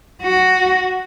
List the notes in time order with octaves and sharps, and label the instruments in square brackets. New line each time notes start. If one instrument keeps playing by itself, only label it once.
[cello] F#4